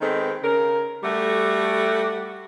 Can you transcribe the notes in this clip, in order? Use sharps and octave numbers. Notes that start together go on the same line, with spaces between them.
D#3 G#3 B3 C4 A4
C#3 A#4
G3 A3 F#4 G4 A4